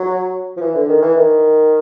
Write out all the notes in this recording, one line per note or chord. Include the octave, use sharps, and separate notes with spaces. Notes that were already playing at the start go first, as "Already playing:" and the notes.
Already playing: F#3
F3
E3
D3
D#3
E3
D#3